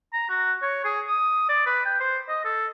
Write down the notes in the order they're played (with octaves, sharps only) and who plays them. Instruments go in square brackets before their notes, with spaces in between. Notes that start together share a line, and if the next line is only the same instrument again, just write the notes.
[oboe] A#5
F#4
C#5
G#4
D#6
D5
B4
G5
C5
D#5
A4